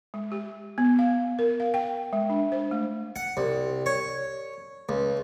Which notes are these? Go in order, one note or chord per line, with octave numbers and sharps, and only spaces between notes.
G#3
G4
B3
F5
A#4
F5
G5
G#3
D4
C5
A3
F#5
C2
C#5
C#2